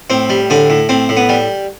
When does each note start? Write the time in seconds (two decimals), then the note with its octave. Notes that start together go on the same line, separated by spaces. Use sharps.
0.10 A2 C4
0.30 G3
0.50 A2 D3 D4
0.70 A2
0.89 A2 C4
1.09 A2
1.17 B3
1.29 G3